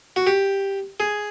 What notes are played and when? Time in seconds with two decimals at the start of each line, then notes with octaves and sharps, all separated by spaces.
0.16 F#4
0.27 G4
1.00 G#4